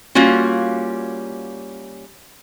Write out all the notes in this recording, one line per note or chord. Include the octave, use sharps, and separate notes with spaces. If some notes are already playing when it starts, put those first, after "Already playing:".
G3 A#3 C#4 F4 F#4